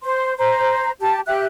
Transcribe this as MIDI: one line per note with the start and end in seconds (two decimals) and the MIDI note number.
0.03 0.35 72
0.03 0.35 84
0.38 0.91 72
0.38 0.91 82
1.01 1.21 67
1.01 1.21 81
1.27 1.45 67
1.27 1.45 76
1.27 1.45 90